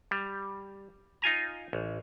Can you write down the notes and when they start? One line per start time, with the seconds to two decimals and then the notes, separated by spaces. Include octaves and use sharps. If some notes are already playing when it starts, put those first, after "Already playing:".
0.11 G3
1.22 D#4 F4 G#5 A#5
1.73 A1